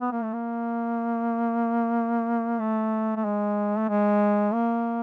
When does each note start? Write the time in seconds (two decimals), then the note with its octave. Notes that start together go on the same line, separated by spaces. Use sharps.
0.01 B3
0.12 A#3
0.23 A3
0.33 A#3
2.60 A3
3.16 A3
3.24 G#3
3.78 A3
3.89 G#3
4.53 A#3